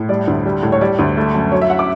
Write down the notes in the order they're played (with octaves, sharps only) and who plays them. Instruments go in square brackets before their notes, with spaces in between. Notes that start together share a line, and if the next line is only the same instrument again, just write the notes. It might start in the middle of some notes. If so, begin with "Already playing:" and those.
Already playing: [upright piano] A2
G3 D5
D2
G3
A2
C#5
G3 D5
D2
A3
F#2
F#3 C#5
E5
F#5
D6